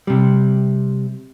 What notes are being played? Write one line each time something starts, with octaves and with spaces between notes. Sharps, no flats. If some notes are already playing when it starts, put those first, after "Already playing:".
C3 G3